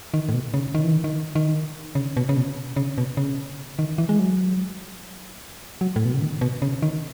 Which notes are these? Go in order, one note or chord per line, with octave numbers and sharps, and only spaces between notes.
D#3
A2
B2
C#3
D#3
E3
D#3
D#3
D#3
C#3
B2
C#3
B2
C#3
B2
C#3
D#3
E3
G#3
F#3
F#3
A2
B2
C#3
D#3
B2
C#3
D#3